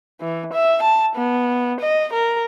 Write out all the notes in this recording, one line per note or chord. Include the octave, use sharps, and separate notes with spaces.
E3
E5
A5
B3
D#5
A#4